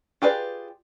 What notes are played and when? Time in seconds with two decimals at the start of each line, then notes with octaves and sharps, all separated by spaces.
0.22 F4 G4 G#4 B4 D5